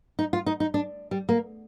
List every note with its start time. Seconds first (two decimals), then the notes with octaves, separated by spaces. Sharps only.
0.19 D#4
0.33 F4
0.46 D#4
0.60 D#4
0.74 D4
1.11 G3
1.29 A#3